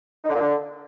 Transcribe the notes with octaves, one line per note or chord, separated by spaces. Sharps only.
D#4
D3
A#2
D3